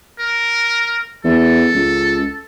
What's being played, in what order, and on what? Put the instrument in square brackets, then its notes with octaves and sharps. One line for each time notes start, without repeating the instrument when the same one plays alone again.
[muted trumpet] A#4
[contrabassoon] E2 [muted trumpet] A4
[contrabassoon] C#2